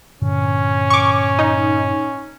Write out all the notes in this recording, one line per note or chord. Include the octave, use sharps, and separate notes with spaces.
G2 A#2 D3 C#4
C#6 D6
D#4